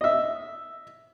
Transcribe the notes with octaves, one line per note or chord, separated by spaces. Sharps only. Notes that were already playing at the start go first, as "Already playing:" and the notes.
D#5 E5